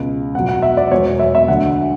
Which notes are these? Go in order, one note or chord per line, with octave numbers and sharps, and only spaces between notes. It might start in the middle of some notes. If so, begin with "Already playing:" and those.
Already playing: C#2 B2 G#3
E2 B2 F#3 F#5
F#5
E5
D5
E1 E2 B2 F#3 C#5
C#5
E5
E5
D2 D3 F#3 F#5